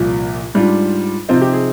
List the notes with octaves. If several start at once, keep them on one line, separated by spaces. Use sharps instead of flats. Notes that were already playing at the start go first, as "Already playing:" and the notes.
Already playing: C2 A#2 F3
G#2 G3 D4 F4
C3 F3 C4 D#4 F4
G4
G#4